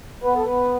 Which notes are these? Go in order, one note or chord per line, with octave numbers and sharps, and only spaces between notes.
B3 B4
A4
B3 B4